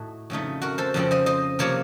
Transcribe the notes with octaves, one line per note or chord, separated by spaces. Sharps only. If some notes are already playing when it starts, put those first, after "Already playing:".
Already playing: A2 A3 D#4 F#4
F2 C#3 A3 D#4
F#4 A#4
A4 C5
F2 C#3 F3 C4
C5 D#5
C5 D#5
C3 F3 A#3 A#4 C#5